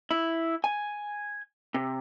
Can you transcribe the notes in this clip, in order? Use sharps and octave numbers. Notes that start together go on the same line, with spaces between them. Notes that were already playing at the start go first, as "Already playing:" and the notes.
E4
G#5
C3